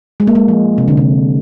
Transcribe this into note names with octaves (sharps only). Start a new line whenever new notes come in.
G#3
A#3
G#3
F3
C3
D3
C3